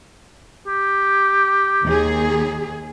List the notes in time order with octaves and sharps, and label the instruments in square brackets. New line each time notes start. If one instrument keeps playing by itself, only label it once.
[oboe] G4
[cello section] D#2 G#4